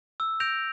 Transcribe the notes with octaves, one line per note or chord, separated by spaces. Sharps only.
E6
G6 A#6 D7 F7